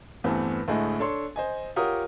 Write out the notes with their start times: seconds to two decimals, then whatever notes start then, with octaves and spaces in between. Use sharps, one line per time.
0.24 E2 G2 E3 A3 C4
0.68 D2 A2 G#3 A3 G#4 D#5
0.99 D4 A4 C#5 C6
1.36 C5 D#5 G#5
1.76 F4 G4 A#4 C#5 F#5 D#6